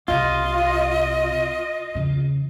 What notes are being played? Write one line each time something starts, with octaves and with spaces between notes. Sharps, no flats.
C2 C3 F4 D#5
E2 C#3